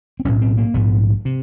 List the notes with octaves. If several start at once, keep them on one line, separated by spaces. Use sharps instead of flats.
C4
B1 A2 C#4
C4
A#3
A#1 G#2 B3
C3